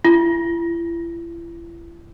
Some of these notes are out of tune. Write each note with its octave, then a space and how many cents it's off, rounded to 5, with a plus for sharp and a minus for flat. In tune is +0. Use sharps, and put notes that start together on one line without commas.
E4 +40